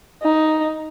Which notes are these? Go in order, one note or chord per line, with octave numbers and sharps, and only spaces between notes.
D#4